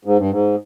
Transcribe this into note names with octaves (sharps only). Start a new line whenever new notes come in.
G#2
G2
G#2